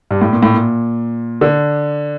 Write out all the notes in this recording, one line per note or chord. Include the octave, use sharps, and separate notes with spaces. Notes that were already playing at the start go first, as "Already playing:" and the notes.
G2
A2
A#2
A2
A#2
D3